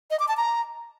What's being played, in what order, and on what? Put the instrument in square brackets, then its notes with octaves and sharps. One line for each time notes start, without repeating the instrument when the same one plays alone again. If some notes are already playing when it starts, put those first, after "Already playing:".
[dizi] D#5
D6
A5
A#5